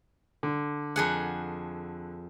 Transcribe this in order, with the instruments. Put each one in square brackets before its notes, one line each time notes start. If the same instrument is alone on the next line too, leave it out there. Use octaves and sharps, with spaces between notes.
[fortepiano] D3
[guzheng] F2 G#4 F#5